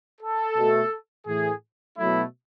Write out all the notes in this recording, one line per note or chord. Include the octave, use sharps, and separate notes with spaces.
A4
B2 A3
A2 E3 A3 G#4
B2 F#3 A3 E4